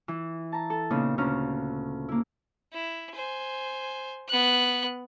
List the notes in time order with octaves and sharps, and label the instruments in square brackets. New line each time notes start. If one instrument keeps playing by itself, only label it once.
[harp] E3
A5 A#5
A4
A#2 C#3 B3 D#4
D2 C#3 C#4 A#5 F6
A#3 E4
[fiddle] E4
C5 G#5
B3 F#6